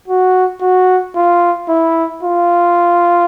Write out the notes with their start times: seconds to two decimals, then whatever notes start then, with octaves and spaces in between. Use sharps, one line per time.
0.08 F#4
0.61 F#4
1.16 F4
1.69 E4
2.23 F4